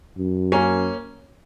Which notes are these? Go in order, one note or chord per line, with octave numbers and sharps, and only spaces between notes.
F#2
A#3 C#4